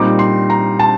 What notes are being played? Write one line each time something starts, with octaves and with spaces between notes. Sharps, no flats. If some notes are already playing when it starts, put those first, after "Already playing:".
Already playing: A#2 G3 C4 D#4 D6
C6
A#5
A5